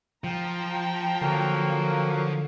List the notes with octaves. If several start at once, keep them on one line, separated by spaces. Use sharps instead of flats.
F3 G5 A#5
D3 F#3 A#3